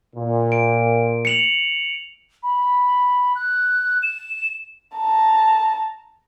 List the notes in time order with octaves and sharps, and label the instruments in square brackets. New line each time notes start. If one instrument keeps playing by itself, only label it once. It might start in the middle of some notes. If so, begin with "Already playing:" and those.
[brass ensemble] A#2
[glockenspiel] D7
C#7 F7 F#7
[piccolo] B5
F#6
E7
[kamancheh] A5 A#5